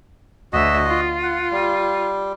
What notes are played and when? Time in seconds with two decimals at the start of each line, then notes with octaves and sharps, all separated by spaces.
0.53 D2 F#4 D#5 E5
0.87 F4
1.23 F#5
1.51 G3